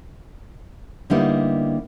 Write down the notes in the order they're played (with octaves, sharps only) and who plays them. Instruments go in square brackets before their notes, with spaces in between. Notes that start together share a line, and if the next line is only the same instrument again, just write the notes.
[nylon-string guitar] D3 G3 A#3 B3 D#4 E4